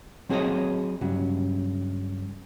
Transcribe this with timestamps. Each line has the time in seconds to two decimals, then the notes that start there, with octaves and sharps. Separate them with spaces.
0.29 F#3 C4 F#4 G#4 C#5 D#5
1.01 G2 C#3 F#3